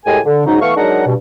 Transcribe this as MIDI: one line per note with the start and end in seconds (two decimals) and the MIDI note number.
0.05 0.19 45
0.05 0.19 56
0.05 0.19 67
0.05 0.19 68
0.05 0.19 70
0.05 0.19 80
0.25 0.43 50
0.46 0.58 44
0.46 0.58 49
0.46 0.58 54
0.46 0.58 63
0.62 0.72 52
0.62 0.72 57
0.62 0.72 59
0.62 0.72 77
0.62 0.72 85
0.77 1.04 54
0.77 1.04 56
0.77 1.04 62
0.77 1.04 63
0.77 1.04 70
0.77 1.04 78
1.06 1.14 43
1.06 1.14 47